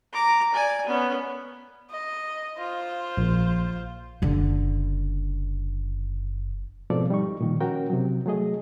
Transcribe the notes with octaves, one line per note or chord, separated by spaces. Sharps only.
A#5 D6
D5 G#5
B3 C#4
D#5
F4 C5
A#1
F#1 D3
G#2 B2 F3 C4 A4 D5
G3 D#4 C#6
A#2 D#3 F3
C#4 F#4 A#4 G5
C3 F#3
F#3 A3 G#4 D#5